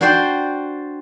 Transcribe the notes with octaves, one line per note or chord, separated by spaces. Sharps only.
D4 F#4 C5 D5 G5